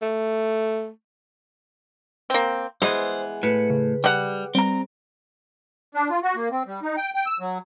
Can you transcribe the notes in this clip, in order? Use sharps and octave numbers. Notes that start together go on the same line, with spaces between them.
A3
A#3 C4
E3 G#3 B3 C5
A2 B4 C#7
C#3
G3 G4 F#5
G3 C4 A#5
D4
F4
F#4
A#3
C4
G3
D#4
G5
G5
E6
F#3